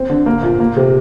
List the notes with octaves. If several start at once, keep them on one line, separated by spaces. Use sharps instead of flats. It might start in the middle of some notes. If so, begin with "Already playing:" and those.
Already playing: C4
D3
A#3
A#2
A#3
C3